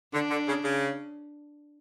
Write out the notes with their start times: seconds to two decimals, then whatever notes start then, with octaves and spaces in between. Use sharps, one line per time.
0.14 D3 D4
0.30 D3
0.47 C#3
0.64 C#3